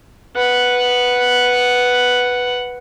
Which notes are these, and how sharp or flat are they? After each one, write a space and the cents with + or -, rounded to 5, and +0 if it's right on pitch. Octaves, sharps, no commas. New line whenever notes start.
B4 +0 F#5 +0